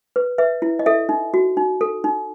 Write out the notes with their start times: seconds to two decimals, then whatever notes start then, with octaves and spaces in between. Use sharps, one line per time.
0.16 B4
0.38 B4 E5
0.62 E4
0.79 D#5
0.86 A4 E5
1.09 D#4
1.34 F#4
1.57 D#4
1.81 A4
2.04 D#4